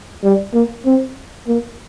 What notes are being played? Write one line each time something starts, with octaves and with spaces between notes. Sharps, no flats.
G3
A#3
C4
A#3